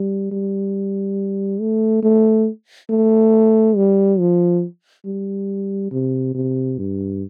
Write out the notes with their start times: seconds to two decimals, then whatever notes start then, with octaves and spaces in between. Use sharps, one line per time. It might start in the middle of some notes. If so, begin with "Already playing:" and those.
Already playing: G3
0.32 G3
1.61 A3
2.03 A3
2.90 A3
3.77 G3
4.20 F3
5.06 G3
5.92 C3
6.35 C3
6.78 G2